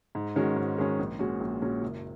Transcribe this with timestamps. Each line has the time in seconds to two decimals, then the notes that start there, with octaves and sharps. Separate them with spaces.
0.15 G#2
0.36 D#3 G#3 C#4 F#4
0.56 G#2
0.78 D#3 G#3 C#4 F#4
0.99 A#1
1.19 A#2 G#3 C#4 F#4
1.40 A#1
1.62 A#2 G#3 C#4 F#4
1.82 F#1